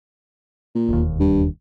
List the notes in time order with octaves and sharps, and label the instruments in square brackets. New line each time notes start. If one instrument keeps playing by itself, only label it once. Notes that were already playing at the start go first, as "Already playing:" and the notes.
[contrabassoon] A#2
[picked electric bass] E1 D#2
[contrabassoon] G2